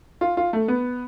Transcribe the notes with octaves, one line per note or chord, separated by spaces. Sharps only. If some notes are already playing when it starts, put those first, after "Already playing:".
F4
F4
A3
B3